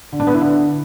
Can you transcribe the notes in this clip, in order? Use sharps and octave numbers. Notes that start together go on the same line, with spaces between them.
D3
D4
B3
E4
D3